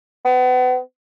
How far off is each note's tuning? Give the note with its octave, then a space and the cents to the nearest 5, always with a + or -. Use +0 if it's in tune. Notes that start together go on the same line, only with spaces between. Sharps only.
B3 +35